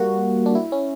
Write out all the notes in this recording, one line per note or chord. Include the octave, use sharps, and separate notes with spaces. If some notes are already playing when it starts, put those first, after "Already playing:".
Already playing: G3 A#3 F#4
D4
E4
C#4